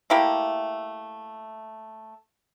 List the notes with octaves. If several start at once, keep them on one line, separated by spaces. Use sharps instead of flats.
A3 A#3 E4 G4